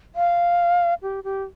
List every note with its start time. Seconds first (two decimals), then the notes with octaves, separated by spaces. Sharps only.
0.16 F5
1.02 G4
1.24 G4